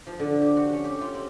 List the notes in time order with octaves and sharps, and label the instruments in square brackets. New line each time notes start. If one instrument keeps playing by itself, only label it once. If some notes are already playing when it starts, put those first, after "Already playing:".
[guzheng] F3
D3
G4
F#4
C#4
G4
F4
C4